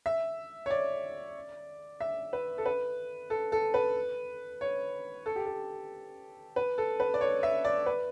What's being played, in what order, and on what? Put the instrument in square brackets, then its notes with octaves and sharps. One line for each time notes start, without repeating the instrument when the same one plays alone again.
[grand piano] E5
C#5
D5
E5
B4
A4
B4
A4
A4
B4
C#5
A4
G4
A4
B4
A4
B4
D5
C#5
E5
D5
B4